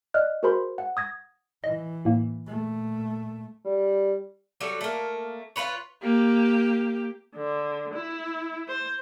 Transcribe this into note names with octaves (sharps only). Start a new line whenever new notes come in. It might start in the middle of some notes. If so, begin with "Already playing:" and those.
D5 D#5 F6 F#6
F#4 G#4 A#4 C5 B5 C6
F#5
D#6 G#6 A#6
E3 D#5
A2 A#3
A#2 A3
G3
F#3 G3 A4
A3 A#3
F4 G4 B4 C#5
A#3 G4
D3
E4
C5